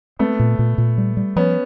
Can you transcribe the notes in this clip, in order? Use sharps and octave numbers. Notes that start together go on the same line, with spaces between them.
A3 B3 C4
A#2
A#2
A#2
G3
G3
F3 B3 C#4